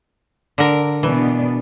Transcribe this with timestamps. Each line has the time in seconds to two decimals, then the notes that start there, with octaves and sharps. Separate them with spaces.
0.58 D3 A#4
1.03 B2 E3 B3 D4